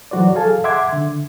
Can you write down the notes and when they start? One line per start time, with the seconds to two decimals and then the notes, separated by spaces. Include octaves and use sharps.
0.11 E3 F#3 F#4 C5 D5
0.35 G#4 A4 F5 G#5 A5
0.64 E5 F#5 C6 D6 G#6
0.93 D3